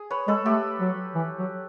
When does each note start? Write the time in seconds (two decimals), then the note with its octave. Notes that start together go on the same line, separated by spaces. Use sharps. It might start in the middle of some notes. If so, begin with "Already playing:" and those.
Already playing: G#4
0.10 B4 C#5
0.28 G#3 A4 B4
0.45 A3 G4 A4
0.80 F#3
1.15 E3
1.38 F#3